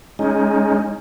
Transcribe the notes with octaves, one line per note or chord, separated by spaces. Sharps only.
G#3 C#4 D#4